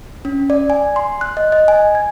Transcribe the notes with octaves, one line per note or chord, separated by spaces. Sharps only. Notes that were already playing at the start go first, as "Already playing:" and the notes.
C#4
D5
G#5
C6
F#6
D#5
D#5
G#5
G#6